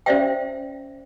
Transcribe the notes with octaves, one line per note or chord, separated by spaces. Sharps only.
C#4 C5 D5 E5 F5 G5